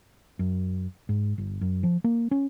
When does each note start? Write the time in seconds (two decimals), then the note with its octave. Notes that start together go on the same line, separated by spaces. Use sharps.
0.39 F#2
1.09 G#2
1.38 G1
1.61 F#2
1.83 F3
2.04 A#3
2.31 C#4